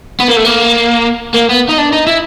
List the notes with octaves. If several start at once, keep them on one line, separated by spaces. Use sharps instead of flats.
B3
A#3
A3
A#3
A#3
B3
D#4
D4
D#4
E4